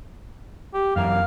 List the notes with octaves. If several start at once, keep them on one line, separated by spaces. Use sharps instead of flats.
G4
F#2 E3 A#4 F5